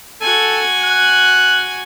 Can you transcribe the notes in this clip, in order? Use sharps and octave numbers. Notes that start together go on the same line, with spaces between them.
F#4 A4 G#5
F#6